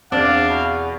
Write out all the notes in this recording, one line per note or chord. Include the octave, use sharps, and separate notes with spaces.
E2 C4 D4 D5 F5
B2